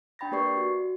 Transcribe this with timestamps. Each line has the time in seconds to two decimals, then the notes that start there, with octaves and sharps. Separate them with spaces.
0.19 D4 G5 B5 A6 A#6
0.32 A#3 G4 B4 D5 C#6 C7
0.57 F#4